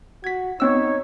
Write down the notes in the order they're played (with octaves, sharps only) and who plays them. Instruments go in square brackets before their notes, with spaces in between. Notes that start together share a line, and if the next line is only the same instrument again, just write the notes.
[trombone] F#4 [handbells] G#6 B6
[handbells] B3 C4 E6 [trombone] D#4 [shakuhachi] C#5